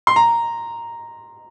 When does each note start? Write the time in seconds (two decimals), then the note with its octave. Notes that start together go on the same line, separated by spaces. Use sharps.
0.07 C6
0.16 A#5